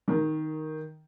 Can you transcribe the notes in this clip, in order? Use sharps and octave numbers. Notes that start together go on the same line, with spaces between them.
D#3